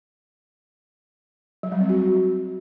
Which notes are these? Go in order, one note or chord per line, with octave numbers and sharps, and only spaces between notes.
F#3
G3
C4
F#4